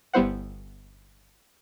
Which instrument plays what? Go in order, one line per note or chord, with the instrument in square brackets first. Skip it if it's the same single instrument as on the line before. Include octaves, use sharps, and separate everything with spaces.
[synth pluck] G1 G3 B3 E4 C5 F#5